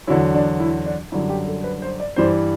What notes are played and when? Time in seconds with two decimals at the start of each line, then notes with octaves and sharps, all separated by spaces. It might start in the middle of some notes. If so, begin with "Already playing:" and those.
0.07 E2 D3 F#3 E4
0.34 D4
0.60 E4
0.86 D4
1.12 F#2 D3 G3 E4
1.29 G4
1.48 A4
1.64 B4
1.82 C5
2.00 D5
2.16 G2 E3 G3 C5